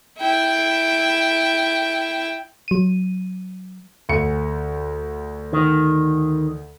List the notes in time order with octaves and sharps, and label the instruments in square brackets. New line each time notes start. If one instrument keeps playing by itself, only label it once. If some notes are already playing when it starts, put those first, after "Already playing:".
[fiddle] E4 G5
[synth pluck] F#3 D#7
[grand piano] D2 C#7
[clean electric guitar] D#3